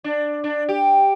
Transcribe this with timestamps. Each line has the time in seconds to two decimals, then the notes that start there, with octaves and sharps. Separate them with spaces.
0.04 D4
0.44 D4
0.69 G4